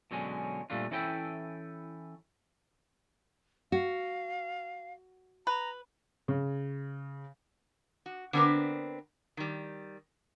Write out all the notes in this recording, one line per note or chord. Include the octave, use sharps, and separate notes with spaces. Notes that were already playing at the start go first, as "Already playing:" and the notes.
B2 D3 F#3 G#3 C#4
A#2 G3 A3 D4 F4
E3 C#4 E4 A4 B4 G5
F#4 F5
B4 A#5
C#3
F#4
D3 B3 C4 D4 A#4 B4
D#3 G3